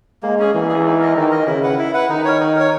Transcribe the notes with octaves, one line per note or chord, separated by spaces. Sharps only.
G#3 A#3
C#4 G#4
E3 A#3
C#4 G#4
D#4
A#4 D#5
D#3 D#4
A#4 D#5
C#3 E4
B4 F#5
E4
B4 F#5
D#3 D#4
A#4 C#5
D#4
A#4 C#5